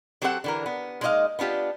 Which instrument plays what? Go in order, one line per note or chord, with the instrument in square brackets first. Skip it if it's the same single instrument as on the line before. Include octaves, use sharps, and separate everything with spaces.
[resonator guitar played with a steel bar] F#3 C4 G4 A4 B4 F#5
D3 E3 A#4
B3
G#3 A#3 D#4 D5 D#5 F5
B3 D4 F4 G4